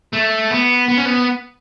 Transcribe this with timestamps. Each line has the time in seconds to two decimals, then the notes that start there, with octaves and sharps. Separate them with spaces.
0.13 A3
0.51 B3
0.88 B3
0.98 C#4
1.05 B3